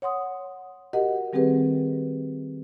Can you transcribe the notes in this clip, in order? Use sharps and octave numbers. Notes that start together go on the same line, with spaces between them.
C#5 F#5 C6 D#6
F#4 G4 A#4 D#5 F#5
D#3 G3 C4 G4 G#4 B4